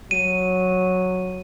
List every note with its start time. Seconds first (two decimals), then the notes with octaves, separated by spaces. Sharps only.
0.11 F#3 D#7